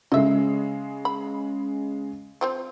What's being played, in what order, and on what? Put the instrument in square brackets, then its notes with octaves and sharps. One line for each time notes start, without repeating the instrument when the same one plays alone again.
[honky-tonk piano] C#3 G#3 [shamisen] D#5 E5
[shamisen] B5
F3 C4 C5